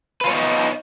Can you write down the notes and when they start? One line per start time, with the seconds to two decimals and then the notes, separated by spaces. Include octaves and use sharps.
0.21 B4
0.24 F4
0.27 C#5
0.30 B3
0.33 D#4